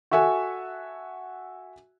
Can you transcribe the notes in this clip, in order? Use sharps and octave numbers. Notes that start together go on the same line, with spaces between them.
F#4 A4 E5 F#5 G#5